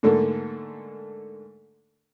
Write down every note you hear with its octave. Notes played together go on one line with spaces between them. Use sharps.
G#2 D3 A3 A#3